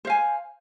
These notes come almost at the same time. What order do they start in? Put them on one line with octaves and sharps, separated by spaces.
C5 F5 G#5